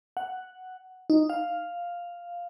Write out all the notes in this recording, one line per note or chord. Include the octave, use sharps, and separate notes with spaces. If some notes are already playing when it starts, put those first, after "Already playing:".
F#5
D#4
F5